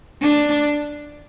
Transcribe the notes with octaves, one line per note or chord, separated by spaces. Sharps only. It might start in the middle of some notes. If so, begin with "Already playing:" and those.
D4